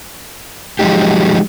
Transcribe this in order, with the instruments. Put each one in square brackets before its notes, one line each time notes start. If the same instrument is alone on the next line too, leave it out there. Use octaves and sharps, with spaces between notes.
[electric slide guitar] F3 F#3 G#3 B3 D#4 G4